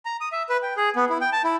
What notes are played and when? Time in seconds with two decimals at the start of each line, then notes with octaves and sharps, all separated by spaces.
0.05 A#5
0.21 D#6
0.32 E5
0.49 B4
0.62 G5
0.77 G#4
0.96 B3
1.09 E4
1.21 G5
1.33 A5
1.44 E4